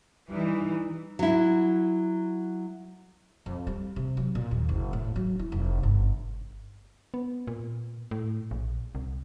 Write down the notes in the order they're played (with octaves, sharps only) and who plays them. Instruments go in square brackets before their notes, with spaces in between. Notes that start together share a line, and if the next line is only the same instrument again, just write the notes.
[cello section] E3 [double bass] G3 D#4
[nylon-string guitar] F#3 E4
[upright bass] F2
G3
C3
F#3
A#2
D#2
F#1
A2
F#3
E4
F1
G1
[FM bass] B3
A#2
A2
A#1
C2